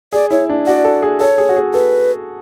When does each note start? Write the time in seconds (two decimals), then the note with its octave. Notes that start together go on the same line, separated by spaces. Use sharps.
0.13 G#4 D5
0.31 E4 C#5
0.49 D4
0.66 F#4 D5
0.85 A4
1.02 G#4
1.20 A4 C#5
1.38 G#4
1.49 F#4
1.57 G#4
1.74 A4 B4